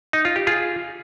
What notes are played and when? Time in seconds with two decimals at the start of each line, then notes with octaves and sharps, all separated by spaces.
0.13 D#4
0.25 F4
0.36 G4
0.47 F4 G#4